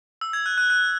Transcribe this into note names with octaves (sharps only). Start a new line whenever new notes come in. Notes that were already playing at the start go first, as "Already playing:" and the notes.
E6
G#6
F#6
F#6
F#6